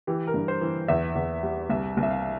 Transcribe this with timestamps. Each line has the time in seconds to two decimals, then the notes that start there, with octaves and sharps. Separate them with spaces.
0.07 E3 G4
0.27 A#4
0.34 G2
0.48 C5
0.61 E3
0.88 E2 E5
1.15 E2
1.43 G3
1.70 C2 E5
1.97 C2
2.03 E5
2.11 F5